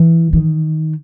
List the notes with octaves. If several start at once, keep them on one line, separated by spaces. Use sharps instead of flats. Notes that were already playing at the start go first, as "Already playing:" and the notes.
Already playing: E3
D#3